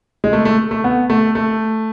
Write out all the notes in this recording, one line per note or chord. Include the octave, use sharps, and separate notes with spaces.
G#3
A3
A3
A3
B3
A3
A3